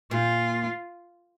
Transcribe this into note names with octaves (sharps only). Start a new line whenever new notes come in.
A#2 F4